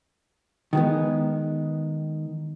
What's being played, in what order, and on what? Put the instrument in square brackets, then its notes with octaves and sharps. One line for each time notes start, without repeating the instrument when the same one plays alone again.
[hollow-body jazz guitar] D#3 G#3 B3